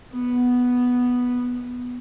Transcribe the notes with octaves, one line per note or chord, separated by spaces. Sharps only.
B3